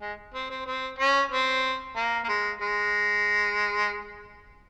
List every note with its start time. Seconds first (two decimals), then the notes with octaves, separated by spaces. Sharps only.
0.01 G#3
0.34 C4
0.50 C4
0.66 C4
0.99 C#4
1.31 C4
1.96 A#3
2.24 A#3
2.28 G#3
2.61 G#3